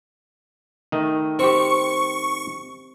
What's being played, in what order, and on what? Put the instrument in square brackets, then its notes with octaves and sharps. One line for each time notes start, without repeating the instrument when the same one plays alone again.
[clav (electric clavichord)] D#3 A3 D#5
[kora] C4 G4 [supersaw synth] C#6